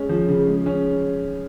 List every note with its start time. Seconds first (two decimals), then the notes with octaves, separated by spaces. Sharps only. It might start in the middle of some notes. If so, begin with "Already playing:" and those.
Already playing: G#3 C#4
0.09 F3
0.29 C#3
0.47 G#3
0.66 C#4